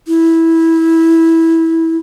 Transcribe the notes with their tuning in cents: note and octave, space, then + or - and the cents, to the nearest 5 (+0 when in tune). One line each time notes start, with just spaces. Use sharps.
E4 -15